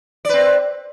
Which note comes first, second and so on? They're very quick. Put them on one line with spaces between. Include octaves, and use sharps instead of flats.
D5 B4 C4